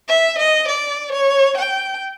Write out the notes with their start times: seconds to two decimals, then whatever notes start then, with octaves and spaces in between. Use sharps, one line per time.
0.08 E5
0.39 D#5
0.68 D5
1.12 C#5
1.58 G5